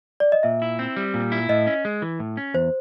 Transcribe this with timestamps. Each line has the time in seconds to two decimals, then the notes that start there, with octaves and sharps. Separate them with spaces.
0.20 D5
0.32 D#5
0.43 A#2 E5
0.62 E4
0.79 C4
0.97 G3
1.14 A#2
1.32 E4
1.49 A2 D#5
1.67 C#4
1.85 G#3
2.02 E3
2.20 A2
2.37 C#4
2.54 E2 C5